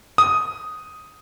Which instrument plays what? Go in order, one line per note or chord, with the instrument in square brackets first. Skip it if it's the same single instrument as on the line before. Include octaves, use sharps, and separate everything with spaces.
[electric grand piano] D#6